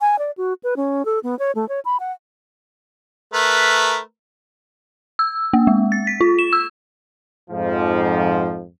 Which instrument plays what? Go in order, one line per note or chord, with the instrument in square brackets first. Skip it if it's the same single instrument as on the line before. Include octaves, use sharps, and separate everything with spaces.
[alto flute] G#5
D5
F#4
B4
C#4
A4
B3
C#5
A3
C#5
B5
F#5
[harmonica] A3 A#4 B4
[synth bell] E6
A#3
G#3
A6
B6
F4
E7
E6
[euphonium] F2 [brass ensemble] G#2 F3